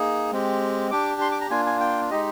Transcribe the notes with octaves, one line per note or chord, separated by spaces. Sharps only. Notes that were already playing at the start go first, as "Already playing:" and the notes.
Already playing: A#3 D#4 G#4
G#3 C4 G4
D4 G4 D6
C6
D6
A#5
A#3 D4 F4 G#5
G#5
G5
G#3 D#4 G4 D#5